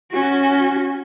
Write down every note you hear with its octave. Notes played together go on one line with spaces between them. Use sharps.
C#4 F#4